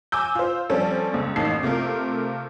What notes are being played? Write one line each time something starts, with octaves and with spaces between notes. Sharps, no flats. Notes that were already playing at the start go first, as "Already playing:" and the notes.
G#5 D6 E6 G6
F4 C5
F3 G3 C4 C#4 A4
C#2
A1 A#3 D#4 A5 C7
C3 A3 F4 A#4